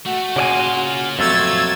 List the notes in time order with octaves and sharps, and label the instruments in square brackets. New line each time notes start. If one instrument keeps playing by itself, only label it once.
[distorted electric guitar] A3 [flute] F#4
[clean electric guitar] C#3 D5 G#5 [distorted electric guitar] A#3 F4
[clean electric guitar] F2 F#3 A3 [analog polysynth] E6 G#6 A6